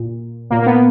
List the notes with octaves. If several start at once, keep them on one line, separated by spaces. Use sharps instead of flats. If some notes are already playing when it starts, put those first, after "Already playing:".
Already playing: A#2
A#2 A#3
A#3
B3